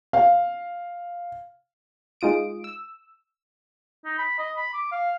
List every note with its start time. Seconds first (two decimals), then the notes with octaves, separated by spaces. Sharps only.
0.13 F5
2.21 G#3 D#4 F4 D#6 D7
2.64 E6
4.05 D#4
4.18 B5
4.38 D#5
4.57 B5
4.74 D6
4.92 F5